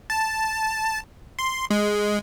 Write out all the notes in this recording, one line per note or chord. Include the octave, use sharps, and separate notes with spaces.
A5
C6
G#3